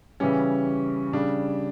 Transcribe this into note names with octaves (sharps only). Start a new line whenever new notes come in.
C#3 E3 G3 C#4
C#3 G3 D4